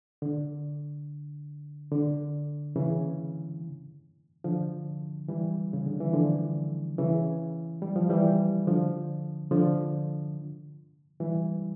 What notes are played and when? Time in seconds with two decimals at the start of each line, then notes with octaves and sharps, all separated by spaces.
0.22 D3
1.92 D3
2.76 C#3 E3
4.44 D3 F3
5.28 E3 G3
5.73 C#3
5.86 D3
6.00 E3
6.14 D3 F3
6.98 C#3 E3
7.82 G3
7.96 F3
8.10 E3 G3
8.67 D3 F3
9.51 D3 F3
11.20 E3 G3